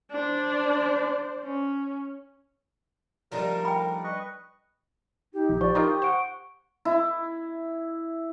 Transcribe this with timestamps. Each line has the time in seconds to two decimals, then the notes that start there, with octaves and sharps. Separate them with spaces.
0.11 D4 C5 D5
1.43 C#4
3.32 F3 G3 A3 D4 D#4 A#4
3.65 G5 B5
4.04 B4 D#5 C#6
5.34 D#4 G4
5.49 A#1
5.61 F3 D5 C#6
5.75 D#4 F4 A#4 D#6
6.02 C5 F#5 C#6 D7
6.85 E4